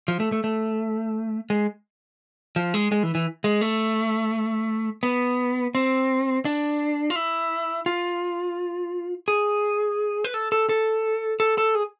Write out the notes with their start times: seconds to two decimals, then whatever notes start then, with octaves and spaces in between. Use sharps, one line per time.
0.08 F3
0.20 A3
0.32 A3
0.44 A3
1.50 G#3
2.56 F3
2.74 G#3
2.92 G#3
3.03 E3
3.15 E3
3.44 G#3
3.61 A3
5.03 B3
5.75 C4
6.45 D4
7.10 F4
7.16 E4
7.86 F4
9.28 G#4
10.24 B4
10.34 A4
10.52 A4
10.69 A4
11.40 A4
11.58 A4
11.75 G#4